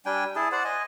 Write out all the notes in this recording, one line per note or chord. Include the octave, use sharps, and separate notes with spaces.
G3 D4 G5 G#5
E4 G#4 A5
C5 D5 F#5
D#5 G#5